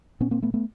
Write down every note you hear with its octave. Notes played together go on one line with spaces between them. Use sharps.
A#2 B3 C#4
A#3 C4
A3 B3
A3 B3